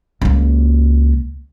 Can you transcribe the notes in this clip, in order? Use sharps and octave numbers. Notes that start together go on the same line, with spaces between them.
C#2 A#3